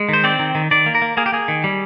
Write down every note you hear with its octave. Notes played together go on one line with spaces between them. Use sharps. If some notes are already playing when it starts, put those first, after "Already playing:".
Already playing: G#3
D#3 C5
C4 D5
D#3
D#3
D#3 D5
A#3
A#4
A#3
A#3 G#4
G4
A#3 G#4
D#3
G3